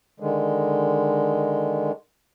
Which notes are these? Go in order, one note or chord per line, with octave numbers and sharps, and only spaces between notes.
D3 D#3 G#3